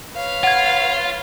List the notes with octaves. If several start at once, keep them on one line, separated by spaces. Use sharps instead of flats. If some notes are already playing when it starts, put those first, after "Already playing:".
B4 C#5 F5
F4 F#5 G#6